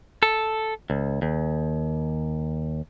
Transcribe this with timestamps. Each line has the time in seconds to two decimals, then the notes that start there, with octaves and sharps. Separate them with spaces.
0.23 A4
0.90 C#2
1.22 D#2